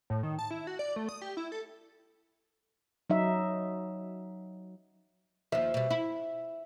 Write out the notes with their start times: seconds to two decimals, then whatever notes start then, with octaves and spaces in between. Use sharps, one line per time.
0.10 A2
0.23 D#3
0.39 A5
0.51 E4
0.67 F#4
0.79 D5
0.96 A3
1.09 D#6
1.22 G4
1.37 E4
1.52 A4
3.10 F#3 D#4 E5
5.52 D#2 F3 E5
5.74 B2 G3
5.90 E4